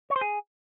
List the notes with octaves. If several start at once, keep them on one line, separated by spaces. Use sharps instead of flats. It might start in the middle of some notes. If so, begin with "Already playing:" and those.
C#5
C5
G#4